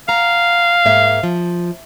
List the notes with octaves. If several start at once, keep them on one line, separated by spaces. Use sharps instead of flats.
F5 F#5 A#5
G#2 A#3 E5
F3